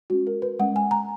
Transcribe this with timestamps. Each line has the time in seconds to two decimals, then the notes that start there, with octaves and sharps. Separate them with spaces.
0.10 G#3 C#4 F#4
0.27 A#4
0.42 B4
0.59 G#3 C#4 F#5
0.76 G#5
0.91 A#5